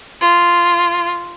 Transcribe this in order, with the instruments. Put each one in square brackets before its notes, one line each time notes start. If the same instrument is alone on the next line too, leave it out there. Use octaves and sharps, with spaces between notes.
[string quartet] F4